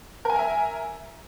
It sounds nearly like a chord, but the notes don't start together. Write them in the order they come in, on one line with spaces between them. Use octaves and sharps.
A#4 G#5 A#5 E5